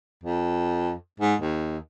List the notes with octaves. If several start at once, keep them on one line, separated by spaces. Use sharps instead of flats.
F2
G#2
D#2